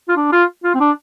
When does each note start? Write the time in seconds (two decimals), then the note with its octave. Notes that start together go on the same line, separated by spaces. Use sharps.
0.09 F4
0.16 D4
0.32 F4
0.64 F4
0.74 C4
0.80 D4